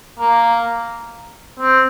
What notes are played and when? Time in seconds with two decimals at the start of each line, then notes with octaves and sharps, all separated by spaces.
0.19 A#3
1.59 C4